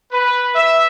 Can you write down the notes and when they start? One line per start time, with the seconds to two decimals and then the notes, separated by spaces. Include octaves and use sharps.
0.12 B4
0.55 E5